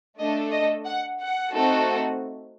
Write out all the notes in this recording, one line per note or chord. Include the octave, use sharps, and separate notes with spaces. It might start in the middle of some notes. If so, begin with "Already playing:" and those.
A3 D4 A4 D#5
D#5
F#5
F#5
A3 C4 D#4 F#4 A4